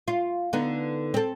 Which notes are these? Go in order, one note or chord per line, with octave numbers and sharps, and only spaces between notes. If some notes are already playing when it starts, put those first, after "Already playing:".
F4
D3 B3 D#4
C4 A4